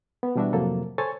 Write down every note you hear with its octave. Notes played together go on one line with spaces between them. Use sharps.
B3
B2 E3 G3 D4 F#4 E5
F2 A2 C3 F#3 A#3 A4
A4 C5 C#5 G#5 C#6 A6